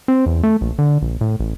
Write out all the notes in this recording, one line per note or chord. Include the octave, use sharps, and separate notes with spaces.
C4
E2
A3
A#1
D3
A#1
A2
A1